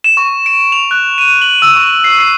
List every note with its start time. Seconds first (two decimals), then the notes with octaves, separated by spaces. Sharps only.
0.04 E7
0.17 C#6
0.46 D7
0.72 F7
0.91 F#6
1.18 D#7
1.42 F#7
1.62 E6
1.76 C#6
2.04 C7
2.19 C7